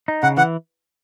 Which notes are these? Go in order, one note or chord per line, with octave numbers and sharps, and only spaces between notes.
D#4
C#3 F#5
E3 F#5